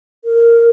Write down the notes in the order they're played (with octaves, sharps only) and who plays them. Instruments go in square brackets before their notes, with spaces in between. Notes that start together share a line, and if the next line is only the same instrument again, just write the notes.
[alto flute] A#4